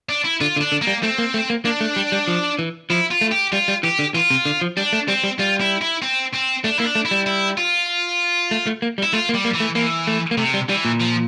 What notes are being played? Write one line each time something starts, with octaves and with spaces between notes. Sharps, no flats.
D4
E4
D3 F4
D3
D4
D3
A#3
G3
A3 C4
A#3
A3
A#3
A#3 D4
A3
G3
G3
F3
E3
F3 E4
F4
A3
G4
G3 F4
G3
E3 G4
D3
E3 F4
C3
D3
F3
G3 D4
A3
G3 C4
G3
G3 F4
E4
E4
C4
C4
A3 D4
A#3 E4
D4
A3
E4
G3
E4
F4
A3
A3
A#3
G3
E4
A3 F4
A#3
G3
A#3
E3
A3
E3 A#3
A3
A#3
C3 A3
G3
E3 G3
A#2
F3